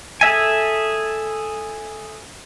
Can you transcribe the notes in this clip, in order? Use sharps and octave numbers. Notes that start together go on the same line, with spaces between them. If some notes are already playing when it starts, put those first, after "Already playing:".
G#4 A4 E5 G#5